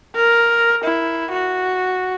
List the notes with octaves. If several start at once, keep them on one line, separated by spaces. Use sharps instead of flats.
A#4
E4
F#4